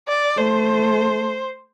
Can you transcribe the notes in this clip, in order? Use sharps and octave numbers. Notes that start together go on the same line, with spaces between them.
D5
A3 C5